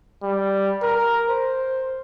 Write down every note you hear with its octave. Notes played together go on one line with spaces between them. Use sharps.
G3
A#4
C5